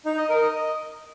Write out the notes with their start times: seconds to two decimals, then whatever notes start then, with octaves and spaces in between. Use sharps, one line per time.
0.06 D#4
0.18 D#5
0.29 A#4
0.41 D#5